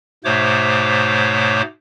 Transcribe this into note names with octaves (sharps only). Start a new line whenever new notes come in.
G#2 B2 A3 C5 C#5 D6